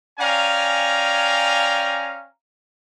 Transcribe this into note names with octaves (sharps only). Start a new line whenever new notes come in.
C#4 D5 F5 G5 G#5 A#5